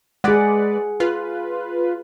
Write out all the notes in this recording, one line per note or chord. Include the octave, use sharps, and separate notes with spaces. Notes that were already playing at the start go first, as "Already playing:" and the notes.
G#3 G#4 B4 D5 F#5
F4 B4